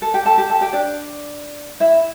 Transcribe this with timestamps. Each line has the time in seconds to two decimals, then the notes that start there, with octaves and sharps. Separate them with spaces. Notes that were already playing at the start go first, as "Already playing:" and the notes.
0.02 A4
0.14 G4 G5
0.25 A4 A5
0.38 G4 G5
0.49 A4 A5
0.61 G4 G5
0.73 D4 D5
1.80 E4 E5